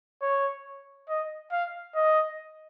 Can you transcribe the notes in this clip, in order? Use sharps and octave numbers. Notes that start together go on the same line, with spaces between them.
C#5
D#5
F5
D#5